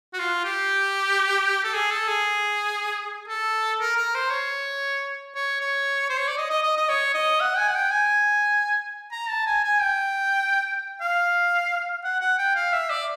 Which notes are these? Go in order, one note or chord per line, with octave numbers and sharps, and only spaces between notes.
F#4
F4
G4
A4
G#4
A4
G#4
A4
A#4
A#4
C5
C#5
C#5
C#5
C5
C#5
D5
D#5
D#5
D#5
D#5
C#5
D#5
F#5
G#5
F#5
G5
G#5
A#5
A5
G#5
G#5
G5
F5
F#5
F#5
G5
F5
E5
D5